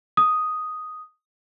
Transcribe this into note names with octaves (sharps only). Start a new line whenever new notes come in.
D#6